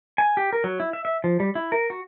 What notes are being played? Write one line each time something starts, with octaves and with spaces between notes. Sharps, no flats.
G#5
G4
A#4
F#3
E4
E5
E5
F3
G3
E4
A#4
F#4